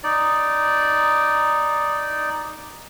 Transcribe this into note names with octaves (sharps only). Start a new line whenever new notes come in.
D#4 D5